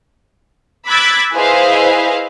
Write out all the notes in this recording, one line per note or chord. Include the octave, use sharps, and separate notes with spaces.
B5 D6 E6 F#6 G#6 A6
E4 G#4 B4 C5 D#5 F5